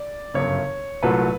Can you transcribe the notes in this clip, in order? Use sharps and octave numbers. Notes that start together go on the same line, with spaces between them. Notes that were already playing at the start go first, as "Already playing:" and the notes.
Already playing: D5
G1 F#2 C#3 C#5
C2 A#2 F#3 A3 B4